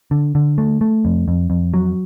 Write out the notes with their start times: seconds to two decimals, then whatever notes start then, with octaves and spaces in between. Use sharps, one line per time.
0.11 D3
0.35 D3
0.58 A3
0.81 A3
1.05 F2
1.28 F2
1.50 F2
1.74 F#3